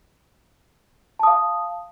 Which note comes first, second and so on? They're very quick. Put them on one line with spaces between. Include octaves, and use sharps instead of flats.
A5 D#6 F5